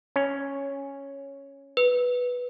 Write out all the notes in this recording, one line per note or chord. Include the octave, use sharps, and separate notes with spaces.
C#4
B4